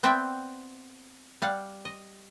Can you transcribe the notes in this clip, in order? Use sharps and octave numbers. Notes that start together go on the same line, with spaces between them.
B3 C4 C5 D5 E5 G5
G3 F5 F#5
D#5